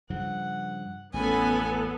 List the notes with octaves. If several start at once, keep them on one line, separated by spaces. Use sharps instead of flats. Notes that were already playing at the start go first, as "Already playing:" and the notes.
G2 C#3 F3 F#5
A1 F2 B3 C#4 A4 G#5 B5